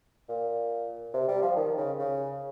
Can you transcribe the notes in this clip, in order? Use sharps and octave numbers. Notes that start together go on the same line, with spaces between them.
A#2
C3
G3
F3
D#3
C#3
C#3